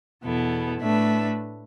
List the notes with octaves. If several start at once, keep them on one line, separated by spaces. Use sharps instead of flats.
E2 B2 B3 E4 A4
A2 A3 D4 B4 E5